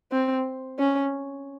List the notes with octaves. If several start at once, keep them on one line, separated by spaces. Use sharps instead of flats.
C4
C#4